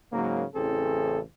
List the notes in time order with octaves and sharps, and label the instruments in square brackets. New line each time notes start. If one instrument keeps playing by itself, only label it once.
[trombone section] G#2 C#3 F#3 A#3
A1 C#3 E3 C4 G#4 A4